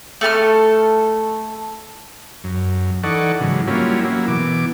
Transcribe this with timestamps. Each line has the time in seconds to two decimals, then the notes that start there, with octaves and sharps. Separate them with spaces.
0.21 A3 A4 A5 F6
2.44 F#2
3.04 E3 D#4 A4 D5 F#5 C#6
3.40 G#2 C#3 E3 F#3
3.67 F#3 G3 A#3 C#4 E4 F4
4.04 F#3 A#3 E4
4.28 B2 E3 D6